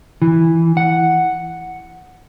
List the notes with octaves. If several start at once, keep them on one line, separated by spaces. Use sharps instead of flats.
E3
F#5